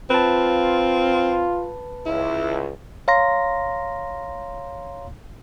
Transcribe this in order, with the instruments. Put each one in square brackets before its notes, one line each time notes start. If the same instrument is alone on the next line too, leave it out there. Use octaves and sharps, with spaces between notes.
[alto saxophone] C4 [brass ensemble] F4 [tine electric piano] B4 A5
[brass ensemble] C#2 [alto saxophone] E4
[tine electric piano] C#5 F5 A#5 C6 A#6